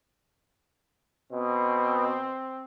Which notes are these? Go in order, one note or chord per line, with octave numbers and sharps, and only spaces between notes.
B2 C4